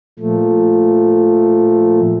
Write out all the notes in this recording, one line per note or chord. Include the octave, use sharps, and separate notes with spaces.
A#2 F3 A3